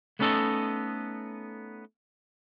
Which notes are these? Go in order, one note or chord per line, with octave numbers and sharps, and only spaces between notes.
A3 B3 C#4 D#4 A4 D#5